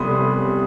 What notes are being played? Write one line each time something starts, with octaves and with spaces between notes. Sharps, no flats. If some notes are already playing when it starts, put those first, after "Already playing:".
Already playing: C2 G3 B3 B5 C6 D#6